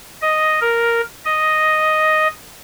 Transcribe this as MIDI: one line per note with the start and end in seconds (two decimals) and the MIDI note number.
0.22 0.60 75
0.61 1.01 70
1.25 2.28 75